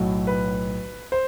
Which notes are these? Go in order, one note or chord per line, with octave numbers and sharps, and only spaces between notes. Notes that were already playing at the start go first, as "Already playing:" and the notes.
Already playing: B1 A2 F#3
B4
C5